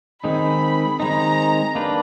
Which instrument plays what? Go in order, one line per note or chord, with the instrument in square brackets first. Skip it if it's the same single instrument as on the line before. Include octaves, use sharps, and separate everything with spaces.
[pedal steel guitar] D#3 G#3 C4 D#4 [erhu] B5
[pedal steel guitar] D#3 G#3 C4 D#4 [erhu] A#5
[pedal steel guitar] A#3 D4 G4 B4